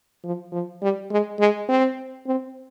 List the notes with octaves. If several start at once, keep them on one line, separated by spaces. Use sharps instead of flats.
F3
F3
G3
G#3
G#3
C4
C4